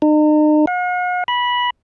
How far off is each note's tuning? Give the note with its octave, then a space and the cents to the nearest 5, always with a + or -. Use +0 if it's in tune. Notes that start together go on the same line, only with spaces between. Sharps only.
D#4 -40
F#5 -45
B5 -15